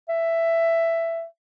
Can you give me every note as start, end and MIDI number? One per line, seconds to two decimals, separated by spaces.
0.09 1.25 76